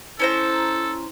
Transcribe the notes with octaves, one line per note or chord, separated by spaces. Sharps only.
C#4 E4 A4 C5 A#5